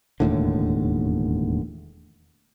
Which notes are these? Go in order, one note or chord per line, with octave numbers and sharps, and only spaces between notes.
E1 D#2 A2 D3